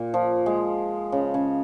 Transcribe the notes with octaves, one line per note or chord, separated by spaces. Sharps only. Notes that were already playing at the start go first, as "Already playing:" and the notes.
Already playing: A#2
F3
G#3
C#3
C#3